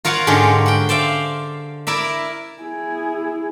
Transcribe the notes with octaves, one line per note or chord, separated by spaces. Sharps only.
F4 A#4 C#5 F5 F#5
G#2 D3 G#3 C#4 G4
F#5 G5
C5 D5 E5 F5
E4 A#4 D5 E5
E4 G#4